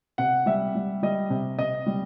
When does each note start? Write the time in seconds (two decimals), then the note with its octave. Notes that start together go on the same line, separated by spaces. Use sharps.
0.18 C3 F#5
0.46 G3 E5
0.75 G3
1.03 G3 D#5
1.30 C3
1.59 C3 D#5
1.87 G3